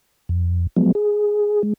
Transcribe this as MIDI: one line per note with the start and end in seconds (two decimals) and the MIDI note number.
0.29 0.67 41
0.76 0.92 53
0.76 0.92 54
0.76 0.92 56
0.76 0.92 59
0.95 1.62 68
1.63 1.73 56